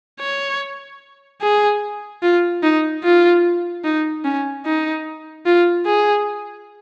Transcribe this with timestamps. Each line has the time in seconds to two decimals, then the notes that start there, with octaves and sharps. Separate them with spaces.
0.20 C#5
1.41 G#4
2.23 F4
2.63 D#4
3.04 F4
3.84 D#4
4.25 C#4
4.66 D#4
5.46 F4
5.86 G#4